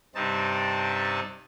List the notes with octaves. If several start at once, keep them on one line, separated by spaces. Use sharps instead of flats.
G2 C3 G3 C4 D#4 A5